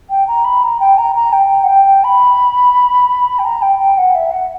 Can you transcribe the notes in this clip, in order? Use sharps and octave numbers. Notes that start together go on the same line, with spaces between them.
G5
A#5
B5
A#5
G5
A#5
A#5
G5
F#5
G5
B5
G5
A#5
G5
G5
F#5
E5
F#5